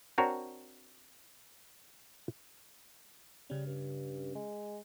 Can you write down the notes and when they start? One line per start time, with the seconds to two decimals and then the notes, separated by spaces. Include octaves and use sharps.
0.18 C4 D4 F#4 A#4 C#5
3.50 C#3 G3 C#4
3.66 G2
4.35 G#3